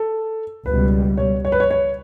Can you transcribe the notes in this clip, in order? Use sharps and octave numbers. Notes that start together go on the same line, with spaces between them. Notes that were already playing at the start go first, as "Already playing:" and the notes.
Already playing: A4
C#2 B2 G3 B4
C#5
C#5
B4
C#5
C#5